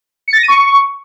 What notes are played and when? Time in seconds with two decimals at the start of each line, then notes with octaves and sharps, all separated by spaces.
0.28 C#7
0.33 A6
0.38 A#6
0.43 D#7
0.48 C#6